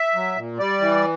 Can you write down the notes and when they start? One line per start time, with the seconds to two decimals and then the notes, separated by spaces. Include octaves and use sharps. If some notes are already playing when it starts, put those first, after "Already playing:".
Already playing: E5
0.15 F#3
0.36 A#2
0.59 G3 D5
0.81 E3